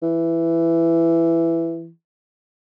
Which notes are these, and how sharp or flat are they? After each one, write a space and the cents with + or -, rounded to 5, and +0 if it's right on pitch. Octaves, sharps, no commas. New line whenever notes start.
E3 +10